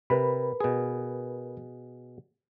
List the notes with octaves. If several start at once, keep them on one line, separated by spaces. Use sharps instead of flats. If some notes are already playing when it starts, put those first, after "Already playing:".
C3 A#4 B4 B5
B2 G#4